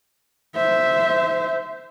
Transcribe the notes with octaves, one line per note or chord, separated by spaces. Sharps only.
C5 E5